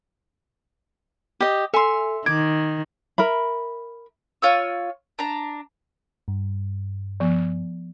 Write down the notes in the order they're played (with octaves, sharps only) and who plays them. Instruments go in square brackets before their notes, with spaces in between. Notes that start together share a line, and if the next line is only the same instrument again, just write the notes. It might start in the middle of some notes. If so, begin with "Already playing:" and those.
[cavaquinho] G4 D#5
[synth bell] A4 G#5 [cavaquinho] E5 C6
[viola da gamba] D#3 [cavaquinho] D6 [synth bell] G#6
[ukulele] A#4 E5 B5
[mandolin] F4 C#5 E6
D4 A#5
[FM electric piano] G2
[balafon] F3 B3